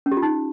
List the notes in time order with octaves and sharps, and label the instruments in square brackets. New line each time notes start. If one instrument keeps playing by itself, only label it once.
[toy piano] C#4
G4
F4
D#4